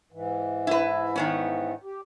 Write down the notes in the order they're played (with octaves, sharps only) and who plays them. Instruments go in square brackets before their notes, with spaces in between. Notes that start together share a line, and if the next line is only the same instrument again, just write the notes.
[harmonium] G#2 E3
[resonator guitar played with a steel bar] E4 B4
D#3 B3 C#4
[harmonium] G4